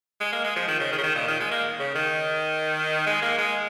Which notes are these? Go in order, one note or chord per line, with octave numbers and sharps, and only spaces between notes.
G#3
A#3
G#3
F3
D#3
C#3
D#3
C#3
D#3
A#2
D#3
G#3
A#3
C#3
D#3
G#3
A#3
G#3